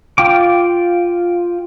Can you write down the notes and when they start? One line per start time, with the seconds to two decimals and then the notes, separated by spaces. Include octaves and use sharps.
0.18 F4 G5 D6